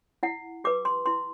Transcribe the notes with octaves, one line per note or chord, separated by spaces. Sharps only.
E4 F#5
G4 B4 D6
C6
E4 C6